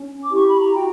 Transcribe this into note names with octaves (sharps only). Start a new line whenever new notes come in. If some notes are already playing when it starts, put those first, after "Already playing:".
Already playing: C#4
D6
E4 G4 C#6
B5
A#5
F#4 G5